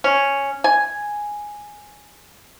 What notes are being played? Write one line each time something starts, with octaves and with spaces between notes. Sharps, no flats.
C#4
G#5